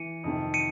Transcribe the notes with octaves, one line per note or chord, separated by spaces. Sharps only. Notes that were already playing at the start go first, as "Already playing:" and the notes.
Already playing: E3 C#7 D#7
F2 C3 D#3
C#7 D#7